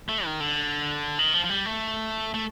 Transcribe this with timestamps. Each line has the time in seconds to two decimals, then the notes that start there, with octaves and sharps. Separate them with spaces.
0.09 A3
0.25 D#3
0.40 D3
1.19 D#3
1.34 F3
1.44 F3
1.50 G3
1.65 A3
2.34 A3